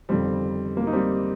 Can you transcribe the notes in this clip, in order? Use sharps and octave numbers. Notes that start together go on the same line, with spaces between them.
G1 F2 C3 D#3 G3 C4
A#3
D#4
G3 C4